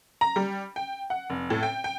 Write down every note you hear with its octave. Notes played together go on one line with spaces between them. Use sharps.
A#5
G3
G5
F#5
F1
A2
G5
G5